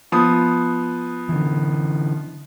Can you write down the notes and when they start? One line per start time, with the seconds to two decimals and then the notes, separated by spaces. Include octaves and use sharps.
0.12 F3 B3 D#6
1.29 D3 E3